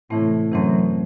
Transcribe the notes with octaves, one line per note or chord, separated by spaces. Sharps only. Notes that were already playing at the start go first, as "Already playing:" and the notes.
A2 C3 E3 A3 C4
F#2 C3 E3 A3 C4